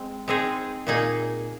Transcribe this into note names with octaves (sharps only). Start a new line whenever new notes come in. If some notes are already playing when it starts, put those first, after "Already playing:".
Already playing: G#3 C4
G#3 C4 D#4 G#4
A#2 A#3 D#4 G#4